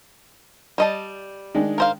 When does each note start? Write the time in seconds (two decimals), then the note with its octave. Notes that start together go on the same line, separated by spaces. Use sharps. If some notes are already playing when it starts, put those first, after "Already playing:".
0.78 G3 D#5 A5
1.54 D#3 G#3 D4
1.78 A#4 C5 F5